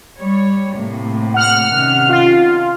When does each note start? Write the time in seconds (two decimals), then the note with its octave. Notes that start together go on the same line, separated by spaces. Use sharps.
0.19 G3 C#5
0.76 A2 C3 A#3
1.34 F#5 F6
1.72 C3 D#3 C#4
2.09 F4